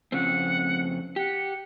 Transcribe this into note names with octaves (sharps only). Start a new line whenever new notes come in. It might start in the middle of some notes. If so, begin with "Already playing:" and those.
F2 C#3 C4 F#5
G4 F#5